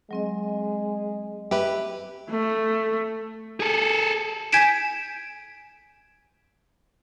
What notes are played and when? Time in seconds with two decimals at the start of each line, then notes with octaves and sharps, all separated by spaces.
0.11 F#3 G#3 C4 D#5
1.51 G4 B4 E5
2.30 A3
3.60 G#4 A4
4.52 G#5 G6 G#6 B6 D7 E7